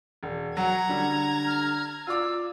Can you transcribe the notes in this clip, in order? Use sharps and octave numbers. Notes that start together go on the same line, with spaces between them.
E1
F#3 F#5 A#5 G#6
D3 G3
F6
F4 D5 D6 E6